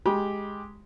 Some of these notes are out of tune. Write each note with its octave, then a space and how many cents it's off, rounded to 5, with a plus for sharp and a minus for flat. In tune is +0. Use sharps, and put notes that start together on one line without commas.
G#3 +0 G4 +0 B5 -30